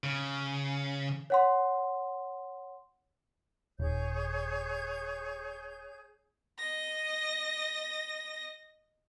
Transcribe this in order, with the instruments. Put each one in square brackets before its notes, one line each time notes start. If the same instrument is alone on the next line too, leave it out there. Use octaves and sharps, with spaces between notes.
[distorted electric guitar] C#3
[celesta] C#5 F#5 C6
[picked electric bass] D#1 [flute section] G#4 C#5 G6
[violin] D#5 A#6